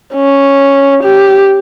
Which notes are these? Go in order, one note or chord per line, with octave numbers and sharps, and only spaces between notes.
C#4
G4